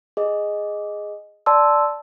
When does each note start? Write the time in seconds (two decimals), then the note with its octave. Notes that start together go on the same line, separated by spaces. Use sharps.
0.17 G#4 D#5
1.46 D5 A5 C6 E6